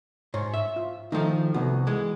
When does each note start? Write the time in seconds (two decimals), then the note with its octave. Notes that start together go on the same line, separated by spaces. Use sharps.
0.34 G#2 C#5
0.54 E5
0.76 F4
1.12 D#3 F3 A3 D#4
1.54 C2 A3 B3 F#4
1.87 E3 G#3